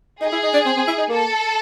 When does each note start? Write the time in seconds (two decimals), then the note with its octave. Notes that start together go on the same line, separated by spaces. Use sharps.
0.21 D#4 G#4
0.33 E4
0.44 D#4
0.54 D4
0.66 C4
0.77 C4
0.88 E4
0.98 D#4
1.09 A#3 A4